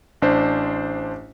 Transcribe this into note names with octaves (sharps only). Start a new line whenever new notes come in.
A1 D4 C5